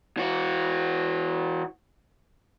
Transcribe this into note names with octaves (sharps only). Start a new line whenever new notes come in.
E3 F#4